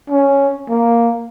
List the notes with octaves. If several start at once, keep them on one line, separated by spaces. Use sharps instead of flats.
C#4
A#3